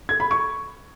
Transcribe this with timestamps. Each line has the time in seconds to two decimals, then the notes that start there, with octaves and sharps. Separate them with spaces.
0.09 G#6
0.20 B5
0.31 C#6